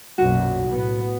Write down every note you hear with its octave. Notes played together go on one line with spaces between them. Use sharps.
B1 F#2 A#2 F#4
A2 B3